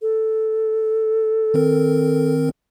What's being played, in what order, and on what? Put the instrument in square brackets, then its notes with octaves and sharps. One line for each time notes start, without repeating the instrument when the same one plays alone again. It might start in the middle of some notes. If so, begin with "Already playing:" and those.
[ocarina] A4
[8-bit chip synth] D#3 C4 A#4